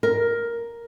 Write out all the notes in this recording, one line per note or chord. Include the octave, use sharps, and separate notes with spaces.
A#4